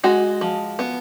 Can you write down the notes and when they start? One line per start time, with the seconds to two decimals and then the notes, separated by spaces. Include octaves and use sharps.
0.04 G#3 F#4
0.41 F3
0.79 B3